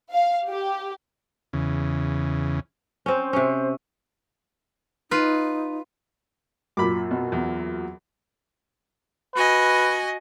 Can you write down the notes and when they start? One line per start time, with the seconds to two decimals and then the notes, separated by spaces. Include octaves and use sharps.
0.12 F5
0.49 G4
1.53 E2 C#3
3.06 C4 C#4 C5
3.33 C3 C#4
5.11 D#4 F4 B4
6.77 F#2 A#2 B5 D6
7.11 B2
7.32 E2
9.35 F#4 B4 D#5 G#5